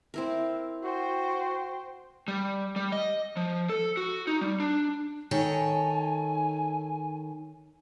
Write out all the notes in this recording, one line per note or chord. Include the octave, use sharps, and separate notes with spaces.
C4 E4 A#4
F#4 C5 G5
G3
G3
D#5
F3
A4
F#4
D#4
G3
D4
D#3 A4 C#5 G#5